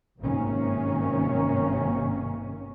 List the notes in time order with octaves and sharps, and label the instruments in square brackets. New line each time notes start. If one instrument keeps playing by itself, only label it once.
[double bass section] G#1 G2 C3 D#3 A#3 C#4